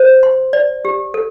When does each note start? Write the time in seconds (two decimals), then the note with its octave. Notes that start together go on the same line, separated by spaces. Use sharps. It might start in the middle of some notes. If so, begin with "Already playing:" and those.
Already playing: C5
0.23 C6
0.53 D5
0.85 G4
1.14 A4